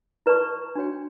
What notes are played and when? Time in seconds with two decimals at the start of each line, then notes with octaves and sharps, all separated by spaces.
0.26 E4 B4 D5 A5 C#6
0.76 D4 F#4 C#5 G5